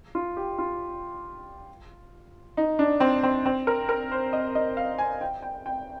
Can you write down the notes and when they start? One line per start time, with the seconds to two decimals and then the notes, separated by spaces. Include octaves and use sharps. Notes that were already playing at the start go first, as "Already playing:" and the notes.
0.15 F4
0.37 G4
0.58 F4
2.57 D#4
2.79 D4
3.00 C4
3.23 C4
3.46 C4
3.67 A#4
3.89 A#4
4.11 C5
4.33 D#5
4.55 D#5
4.77 F5
4.98 G#5
5.21 G5
5.43 G5
5.66 G5